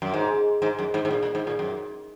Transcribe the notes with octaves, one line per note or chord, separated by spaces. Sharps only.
F#2
G#2
G#2
F#2
G#2
G#2
A#2
A#2
G#2
A#2
F#2